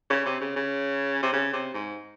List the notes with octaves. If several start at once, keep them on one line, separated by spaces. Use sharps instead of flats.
C#3
C3
C#3
C#3
C3
C#3
C3
G#2